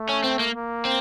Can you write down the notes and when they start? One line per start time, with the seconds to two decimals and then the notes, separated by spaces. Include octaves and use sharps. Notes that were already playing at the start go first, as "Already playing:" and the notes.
Already playing: A3
0.09 C#4
0.24 C4
0.40 A#3
0.55 A#3
0.85 C4